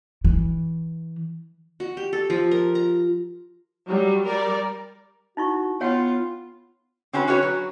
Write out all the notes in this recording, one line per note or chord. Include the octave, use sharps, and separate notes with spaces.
E3
F#4
G4
A4
F3
A#4
A#5
F#3 G3
G3 A#4 D5
D#4 E4 F#4 C#6
B3 F4 C#5 F#5 G5
C4 C#4 F#4 B4
C#4 F#4 B4 C#5
F#3